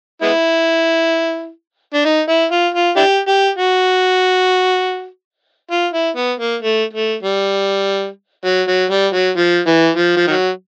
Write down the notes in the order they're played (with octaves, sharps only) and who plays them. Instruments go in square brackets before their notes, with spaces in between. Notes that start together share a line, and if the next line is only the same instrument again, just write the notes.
[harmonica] G#3 B3 E4
D4
D#4
E4
F4
F4
D4 E4 G4
G4
F#4
F4
E4
B3
A#3
A3
A3
G3
F#3
F#3
G3
F#3
F3
E3
F3
F3
D#3 F#3